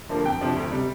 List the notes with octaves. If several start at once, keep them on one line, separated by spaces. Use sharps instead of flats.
G2 D3 F3 A#3
F2 G5
C3 F3 D4
D2
C3 G3